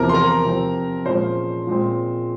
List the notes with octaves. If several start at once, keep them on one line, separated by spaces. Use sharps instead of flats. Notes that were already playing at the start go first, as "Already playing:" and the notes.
Already playing: E2 C3 F3 A#4 A#5
C6
A#4 A#5
C3 F3 C4
A#2 F3 G#3 C#4 C5 C6
A#2 G#3 C4